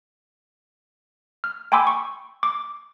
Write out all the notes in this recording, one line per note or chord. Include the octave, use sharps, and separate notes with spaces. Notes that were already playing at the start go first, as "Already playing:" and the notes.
F6
G5 G#5 B5 C6 D6 E6
C#6
D6